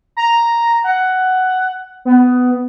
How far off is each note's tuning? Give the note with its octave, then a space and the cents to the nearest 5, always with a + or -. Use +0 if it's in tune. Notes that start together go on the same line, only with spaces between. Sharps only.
A#5 +0
F#5 +10
B3 +15